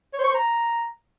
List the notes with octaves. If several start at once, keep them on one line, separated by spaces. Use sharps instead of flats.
C#5
C5
C#6
C5
A#5